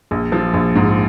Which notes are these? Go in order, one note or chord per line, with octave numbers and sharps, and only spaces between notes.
A#1
F3
A#1
G#2